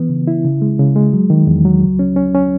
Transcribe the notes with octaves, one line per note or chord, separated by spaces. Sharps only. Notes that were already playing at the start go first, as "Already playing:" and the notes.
Already playing: E3 B3
C#3
E4
C#3
G#3
C#3
G#3
F#3
D#3
E2
F#3
C#2
C#4
C#4
C#4